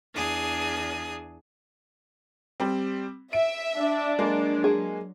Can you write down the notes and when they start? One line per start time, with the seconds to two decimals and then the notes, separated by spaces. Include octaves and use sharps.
0.14 E2 D4 G#4 D#6
2.60 G3 C4
3.33 E5 D7
3.77 D4
4.19 F#3 G#3 A#3
4.64 G#4